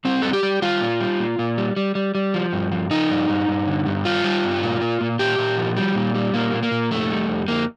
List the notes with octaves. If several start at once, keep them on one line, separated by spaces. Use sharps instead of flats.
G3 C4
G3 A4
G4
G3
G3 F4
A#2
G3
A#2
A#2
G3
G3
G3
G3
F3
G2
F3
F3 D#4
G2
G2
G2
D3
G2
G3 F4
G3
G2
A#2
A#2
A#2
A#2 G4
A#2
F3
G3
A#2
G3
A#2 A#3
A#2
A#3
A#2
F2 A3
G3
F2
F2 A#3